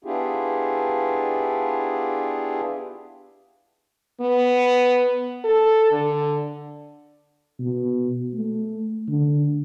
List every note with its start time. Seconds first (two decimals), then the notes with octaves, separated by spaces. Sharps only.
0.04 B3 D4 E4 F4 G4 G#4
4.21 B3
5.44 A4
5.92 D3
7.59 B2
8.34 A3
9.08 D3